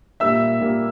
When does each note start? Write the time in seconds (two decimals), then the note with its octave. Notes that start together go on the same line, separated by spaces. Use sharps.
0.20 A#2 G3 A#3 E5 E6
0.60 A#2 G3 A#3